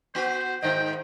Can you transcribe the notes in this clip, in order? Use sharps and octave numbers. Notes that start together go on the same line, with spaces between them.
B3 F#4 C5
G#2 D#3 C5 D#5 G5